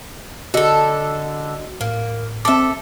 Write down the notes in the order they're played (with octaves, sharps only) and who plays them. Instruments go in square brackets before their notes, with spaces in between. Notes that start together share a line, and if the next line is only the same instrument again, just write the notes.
[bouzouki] D3 A4 [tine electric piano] F#4 D#5
[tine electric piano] A2 [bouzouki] A#3
[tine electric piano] C4 D6 [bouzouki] A4 E5